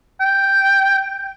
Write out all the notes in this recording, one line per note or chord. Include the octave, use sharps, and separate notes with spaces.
G5